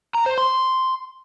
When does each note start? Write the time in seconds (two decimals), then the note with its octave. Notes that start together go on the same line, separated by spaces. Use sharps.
0.15 A#5
0.26 C5
0.38 C6